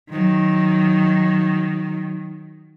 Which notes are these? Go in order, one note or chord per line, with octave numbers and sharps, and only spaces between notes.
D#3 F#3